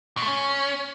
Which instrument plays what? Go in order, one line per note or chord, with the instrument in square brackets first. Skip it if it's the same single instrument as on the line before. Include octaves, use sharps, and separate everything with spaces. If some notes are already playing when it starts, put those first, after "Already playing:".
[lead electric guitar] B2
A3
C#4